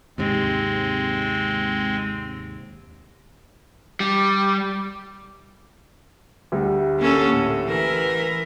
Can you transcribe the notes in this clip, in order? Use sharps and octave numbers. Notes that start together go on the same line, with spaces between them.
D#2 G#2 C3 G#3 C4
G3
D2 G3
A#3 C#4 A4
A2
E3 A#4